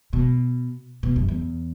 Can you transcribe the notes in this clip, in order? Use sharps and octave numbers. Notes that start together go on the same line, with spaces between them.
B2
B2
F#2
E2